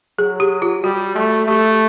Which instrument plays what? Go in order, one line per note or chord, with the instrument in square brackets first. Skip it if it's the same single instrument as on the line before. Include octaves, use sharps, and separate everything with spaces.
[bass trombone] F#3 [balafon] G#4
[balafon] G4
F4
[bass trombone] G3 [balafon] F#4
[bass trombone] A3
[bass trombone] A3 [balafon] G4